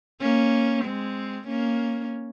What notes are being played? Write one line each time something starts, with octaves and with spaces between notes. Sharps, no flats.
A#3 C#4
G#3 C4
A#3 C#4